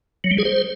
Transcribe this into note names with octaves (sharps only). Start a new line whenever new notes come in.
F#3
G3
G#4
C5